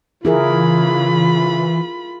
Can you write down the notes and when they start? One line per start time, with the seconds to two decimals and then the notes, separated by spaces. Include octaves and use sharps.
0.25 C#3 E3 E4 F4 G#4 A#4 B5